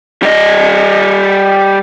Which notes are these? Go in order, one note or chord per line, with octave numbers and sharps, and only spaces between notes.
G3 D#5